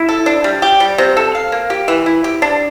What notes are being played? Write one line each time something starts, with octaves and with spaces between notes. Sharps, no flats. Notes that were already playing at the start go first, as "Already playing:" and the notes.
Already playing: E4
A4
D4
G3
G4
G3
C3
A4
F5
A#3
G4
E3
E4
G4
D4